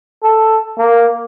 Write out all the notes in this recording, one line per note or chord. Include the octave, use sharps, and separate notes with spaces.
A4
A#3